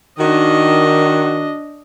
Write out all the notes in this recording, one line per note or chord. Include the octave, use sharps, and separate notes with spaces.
D#3 D4 F#4 D#5